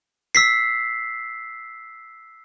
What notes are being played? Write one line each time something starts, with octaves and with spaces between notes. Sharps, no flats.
E6 B6 C7